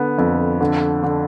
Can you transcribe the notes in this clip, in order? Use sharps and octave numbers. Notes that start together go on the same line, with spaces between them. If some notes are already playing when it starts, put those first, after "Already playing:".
Already playing: D3 B3
F2
D3
D3